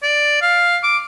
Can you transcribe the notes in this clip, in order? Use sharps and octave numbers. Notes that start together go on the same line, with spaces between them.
D5
F5
D6